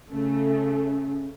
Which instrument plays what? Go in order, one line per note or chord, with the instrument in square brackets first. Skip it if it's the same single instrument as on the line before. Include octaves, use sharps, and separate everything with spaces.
[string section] C#3 A3 [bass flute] C#4